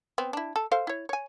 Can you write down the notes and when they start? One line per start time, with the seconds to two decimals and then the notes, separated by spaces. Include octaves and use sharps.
0.18 B3 C4
0.33 D4 E4
0.56 A4
0.72 A4 C5 F5
0.87 E4 C#5
1.09 C#5 G#5